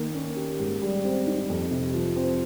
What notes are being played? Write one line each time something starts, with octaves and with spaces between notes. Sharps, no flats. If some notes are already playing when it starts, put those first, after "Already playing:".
Already playing: D#3 A#3
C#4
G4
G#2
G3
C4
D#4
F2
C3
F3
C4